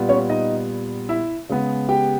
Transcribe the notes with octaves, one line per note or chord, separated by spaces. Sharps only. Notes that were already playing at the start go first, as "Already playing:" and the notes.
Already playing: A#2 G3 B3
C#4 C#5
D#4 D#5
E4 E5
C#3 G#3 B3
G4 G5